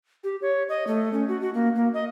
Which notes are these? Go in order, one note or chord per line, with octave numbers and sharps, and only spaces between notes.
G4
C#5
D#5
A3
C#4
F#4
F#4
A#3
A#3
D#5